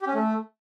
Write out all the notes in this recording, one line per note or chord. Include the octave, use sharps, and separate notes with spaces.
G4
C#4
A3